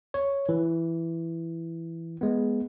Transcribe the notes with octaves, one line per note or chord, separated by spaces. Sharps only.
C#5
E3
G#3 B3